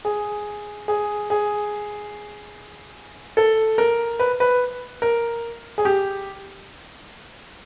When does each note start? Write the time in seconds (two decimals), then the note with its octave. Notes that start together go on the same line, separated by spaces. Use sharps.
0.05 G#4
0.88 G#4
1.30 G#4
3.37 A4
3.78 A#4
4.19 B4
4.40 B4
5.02 A#4
5.78 G#4
5.85 G4